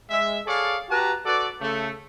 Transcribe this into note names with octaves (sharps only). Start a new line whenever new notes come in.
G#3 E5
G#4 A4 C#5 D5 F5
F#4 G4 B4 A5 A#5
F#4 A4 B4 D5
C#3 A3